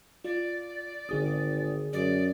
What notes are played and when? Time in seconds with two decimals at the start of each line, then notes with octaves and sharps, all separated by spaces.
0.25 F4 D5
1.09 G#1 D3 G#4 D#6
1.93 F#2 D5